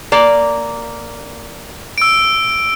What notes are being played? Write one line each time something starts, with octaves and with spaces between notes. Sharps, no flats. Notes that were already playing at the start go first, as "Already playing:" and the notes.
A#3 D5
E6 D7